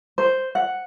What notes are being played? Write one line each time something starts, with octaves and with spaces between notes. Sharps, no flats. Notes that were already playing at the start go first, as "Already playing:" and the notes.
C5
F#5